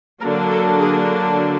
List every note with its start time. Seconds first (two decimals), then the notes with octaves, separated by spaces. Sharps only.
0.22 D3 F#3 A#3 D4 A#4
0.50 A4
0.79 G#4